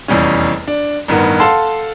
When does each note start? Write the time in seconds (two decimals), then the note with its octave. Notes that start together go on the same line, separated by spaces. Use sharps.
0.08 F1 E2 G3 C#4
0.67 D4
1.08 A1 G2 D#3 B3 A#4
1.40 A4 F5 F#5 A5 C6 E6